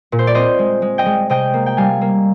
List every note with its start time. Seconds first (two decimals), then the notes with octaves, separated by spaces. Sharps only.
0.12 A#2
0.19 C5
0.27 D5
0.35 C4 C5 D#5
0.59 G#3
0.82 G#3
0.98 D#5 G5
1.06 G#3
1.30 C3 D#5 G5
1.54 A#3
1.66 G5
1.77 G3 F5 G#5
2.01 A#3